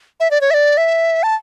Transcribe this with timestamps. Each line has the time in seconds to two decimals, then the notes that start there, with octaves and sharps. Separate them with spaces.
0.20 E5
0.31 D5
0.41 C#5
0.51 E5
0.54 D5
0.77 E5
1.23 A5